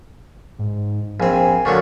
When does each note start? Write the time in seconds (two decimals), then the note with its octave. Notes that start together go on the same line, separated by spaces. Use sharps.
0.59 G#2
1.20 A#1 C4 G#5
1.65 A#2 D3 F#3 C#6